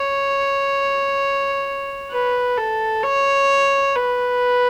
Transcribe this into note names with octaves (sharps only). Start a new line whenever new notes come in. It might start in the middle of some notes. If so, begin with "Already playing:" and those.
Already playing: C#5
B4
A4
C#5
B4